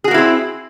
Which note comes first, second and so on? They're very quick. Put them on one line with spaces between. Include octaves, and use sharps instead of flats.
G#4 F#4 A#3 E4 C4